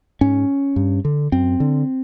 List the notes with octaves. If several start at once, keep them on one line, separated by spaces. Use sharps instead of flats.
G#2 C#4
G2
D3
F#2 C4
D3